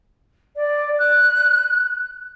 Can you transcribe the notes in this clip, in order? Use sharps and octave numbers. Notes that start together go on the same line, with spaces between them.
D5
F#6